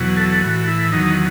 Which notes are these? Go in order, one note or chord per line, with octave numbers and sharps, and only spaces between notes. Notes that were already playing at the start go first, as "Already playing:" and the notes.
Already playing: E2 B2 F#3
A4
A2 E3 F#4
E4
E2 D#3 F#3 D#4